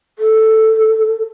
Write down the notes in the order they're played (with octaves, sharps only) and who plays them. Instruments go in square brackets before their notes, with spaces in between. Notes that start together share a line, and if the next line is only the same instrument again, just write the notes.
[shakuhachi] A4